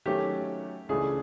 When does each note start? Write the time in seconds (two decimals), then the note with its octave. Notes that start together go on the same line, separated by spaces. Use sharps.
0.05 D#3 F#3 A3 C#4 F#4 G4
0.89 C#2 C#3 E3 A3 D4 G#4